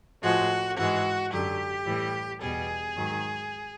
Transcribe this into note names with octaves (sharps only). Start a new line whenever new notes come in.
A2 F3 G#3 F#4
G#2 E3 G#3 F#4
F#2 D3 F#3 G4
A2 E3 G3
E2 B2 G3 G#4
G#2 D#3 F#3